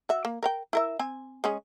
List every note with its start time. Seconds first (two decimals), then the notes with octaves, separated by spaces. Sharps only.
0.09 F#4 E5
0.25 A#3
0.43 A#4 F5 G5
0.73 E4 A#4 E5
0.99 C4 G#5
1.44 G#3 C#4 G#4